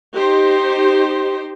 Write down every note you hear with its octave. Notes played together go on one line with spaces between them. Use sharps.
D#4 G4 C5